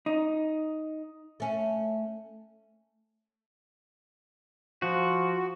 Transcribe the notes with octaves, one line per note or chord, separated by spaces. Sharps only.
D#4
A3 C#4
F3 F#4